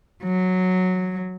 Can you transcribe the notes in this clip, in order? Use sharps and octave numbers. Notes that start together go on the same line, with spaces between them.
F#3